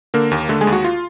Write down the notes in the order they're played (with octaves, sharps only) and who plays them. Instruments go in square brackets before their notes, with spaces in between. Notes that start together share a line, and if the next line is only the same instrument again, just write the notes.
[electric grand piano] D3 A#3 A#4
D#2
D3 A3 A4
G#3 G#4
D#2
F#4
F4